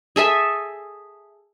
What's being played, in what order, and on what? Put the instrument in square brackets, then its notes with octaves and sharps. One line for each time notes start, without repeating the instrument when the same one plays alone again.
[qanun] G#4 A4 E5 G#5